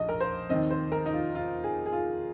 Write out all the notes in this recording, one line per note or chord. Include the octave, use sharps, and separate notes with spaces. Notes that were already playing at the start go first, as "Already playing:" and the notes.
Already playing: A#1 D#5
A#4
C5
D#2 D#3 C4 D#5
C5
A#4
D#4
F4
F4
G#4
G#4
F4